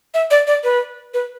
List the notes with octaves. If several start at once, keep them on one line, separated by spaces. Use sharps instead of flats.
E5
D5
D5
B4
B4